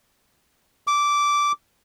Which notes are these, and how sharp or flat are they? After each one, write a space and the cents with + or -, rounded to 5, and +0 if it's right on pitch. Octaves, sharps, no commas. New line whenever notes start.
D6 -10